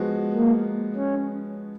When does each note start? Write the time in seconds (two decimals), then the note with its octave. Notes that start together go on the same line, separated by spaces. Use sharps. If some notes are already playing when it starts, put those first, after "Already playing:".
Already playing: F3 G#3 B3 F#4
0.33 A#3
0.96 C#4